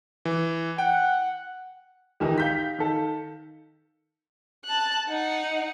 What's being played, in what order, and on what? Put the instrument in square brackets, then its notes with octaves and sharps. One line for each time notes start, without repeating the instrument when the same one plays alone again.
[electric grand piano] E3
[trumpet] F#5 [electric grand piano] G5
[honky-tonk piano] C#2 D#3 E3 [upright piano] D#4 G4
[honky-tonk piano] F5 G6 B6
[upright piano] D#3 A4
[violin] A5 F#6
D#4 F#5